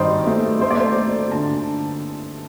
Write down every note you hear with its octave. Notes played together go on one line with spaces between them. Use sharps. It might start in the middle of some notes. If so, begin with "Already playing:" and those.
Already playing: G2 D#3 D#4 C5 D5
A3
A3 C5
D5
C5
A3
D3 A5